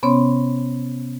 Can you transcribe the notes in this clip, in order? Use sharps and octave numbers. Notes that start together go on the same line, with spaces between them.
C3 B3 C#4 C#5 C6